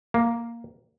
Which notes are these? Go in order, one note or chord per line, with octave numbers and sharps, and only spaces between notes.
A#3